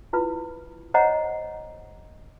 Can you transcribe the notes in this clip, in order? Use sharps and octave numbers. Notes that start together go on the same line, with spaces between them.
E4 F4 B4
C5 C#5 D#5 F#5 A#5